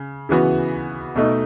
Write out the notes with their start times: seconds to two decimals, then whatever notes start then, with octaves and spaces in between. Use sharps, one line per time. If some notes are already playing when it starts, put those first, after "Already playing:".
Already playing: C#3
0.29 C#3 E3 B3 F#4
1.16 B2 A3 D#4